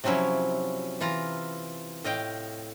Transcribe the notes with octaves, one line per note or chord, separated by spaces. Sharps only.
C3 F3 F#3 C#4 E4
E3 F4 A#5
A2 D#5 F5 G5